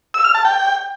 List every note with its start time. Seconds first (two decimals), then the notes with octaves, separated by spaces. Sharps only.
0.14 E6
0.24 F6
0.35 A5
0.45 G5